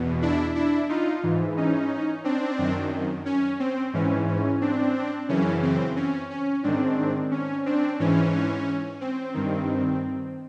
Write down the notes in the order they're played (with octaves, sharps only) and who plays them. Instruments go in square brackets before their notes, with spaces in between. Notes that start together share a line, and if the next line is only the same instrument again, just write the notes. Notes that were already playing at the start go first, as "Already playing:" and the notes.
Already playing: [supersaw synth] E2 B2
D4 E4
D4 E4
D#4 F4
G#2 E3
C#4 D#4
C4 D4
F#2 D#3
C#4
C4
G#2 E3 C#4
C#4
C4 D4
F#2 C#3 E3 C#4
C4
C#4
C#4
G#2 D#3 C4 D4
C#4
C4 D4
G#2 E3 C#4
C4
G2 D#3